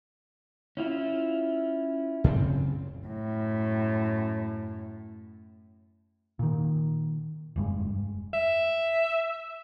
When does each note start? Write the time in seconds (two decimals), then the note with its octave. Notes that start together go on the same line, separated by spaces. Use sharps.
0.77 C#4 E4 F4
2.24 F#2 C#3 C4
3.08 F#2 A2
6.39 A#2 D#3
7.56 F1 G2 G#3
8.33 E5